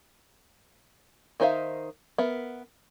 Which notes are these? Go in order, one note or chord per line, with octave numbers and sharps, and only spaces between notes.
D#3 D#4 C5 E5 F5
B3 A#4 E5